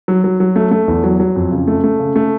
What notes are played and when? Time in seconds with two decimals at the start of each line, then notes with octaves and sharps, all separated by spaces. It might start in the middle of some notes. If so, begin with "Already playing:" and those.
0.08 F#3
0.24 F#3
0.40 F#3
0.56 A3
0.71 A3
0.88 E2
1.04 F#3
1.20 F#3
1.36 F2
1.52 C#3
1.68 A3
1.84 A3
2.00 C#3
2.16 A3